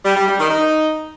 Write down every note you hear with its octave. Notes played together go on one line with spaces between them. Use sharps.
G3
G3
G3
D#3
D#4